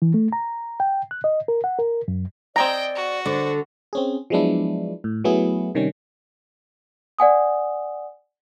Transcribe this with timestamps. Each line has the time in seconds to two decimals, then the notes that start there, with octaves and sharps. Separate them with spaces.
0.02 E3
0.14 A3
0.33 A#5
0.80 G5
1.11 F#6
1.24 D#5
1.48 A#4
1.64 F#5
1.79 A#4
2.08 F#2
2.56 C4 G#4 D5 D#5 G5 A#5
2.95 F#4
3.26 D3 D4 C5
3.93 C4 C#4 G#4
4.30 F3 F#3 G#3 B3 D4 E4
5.04 A2
5.24 F#3 A3 B3 E4 G#4
5.75 C3 D#3 G3 C#4
7.19 D5 F#5 G#5 D#6